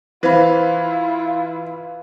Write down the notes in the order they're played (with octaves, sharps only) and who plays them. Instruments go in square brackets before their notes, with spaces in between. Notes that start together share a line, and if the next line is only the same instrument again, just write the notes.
[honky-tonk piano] E3 [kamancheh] E4 F4 [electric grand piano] B4 F5 [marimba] C5 B5